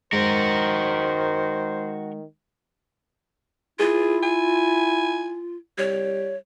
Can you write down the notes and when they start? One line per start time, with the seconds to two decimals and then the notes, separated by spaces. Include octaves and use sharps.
0.13 D#3 G#3 F#4 A#4 C5
3.80 E4 F4 G#4
4.23 G#5
5.78 G3 C#5